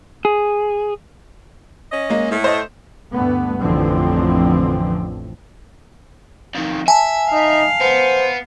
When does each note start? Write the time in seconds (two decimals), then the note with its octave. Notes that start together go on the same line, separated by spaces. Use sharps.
0.25 G#4
1.92 C#4 D#5
2.10 G#3 A#3
2.31 A2 A3
2.44 C5 D#5
3.13 D2 G2 A3 B3
3.60 A1 F2 D3 E3 F3 C4
6.55 F2 D#3
6.88 E5 G#5 A5
7.32 D#4 F5
7.81 B3 C5